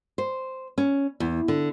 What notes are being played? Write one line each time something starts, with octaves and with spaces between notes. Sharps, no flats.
C5
C#4
E2
D3